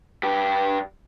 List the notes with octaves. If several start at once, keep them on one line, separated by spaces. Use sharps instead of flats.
G2 G4